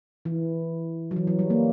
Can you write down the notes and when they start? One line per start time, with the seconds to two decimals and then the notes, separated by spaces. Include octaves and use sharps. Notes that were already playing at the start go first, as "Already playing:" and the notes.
0.25 E3
1.11 F#3
1.16 E3
1.27 F#3
1.39 G3
1.50 A#3